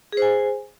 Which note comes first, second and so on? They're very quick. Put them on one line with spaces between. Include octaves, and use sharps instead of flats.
G#4 C5 G#5